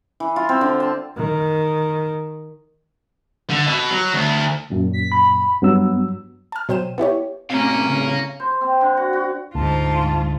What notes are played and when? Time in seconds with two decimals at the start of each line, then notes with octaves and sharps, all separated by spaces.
0.20 E3
0.36 F4
0.49 C4
0.61 D3
0.80 A5
1.17 D#3
3.50 D3
3.67 B2
3.91 F#3
4.14 D2
4.70 F#2 A#2
4.93 B6
5.12 B5
5.62 G2 F#3 B3 E6
6.52 A5 F6
6.69 B2 F#3 C5 G5 D#7 E7
6.98 B3 E4 G4 C#5
7.50 A2 C3 C#4 F5 A#5
7.87 C#3
8.40 C5
8.61 C4
8.81 D3
8.97 F#4
9.13 F#4
9.55 D2 G#2 F4 A5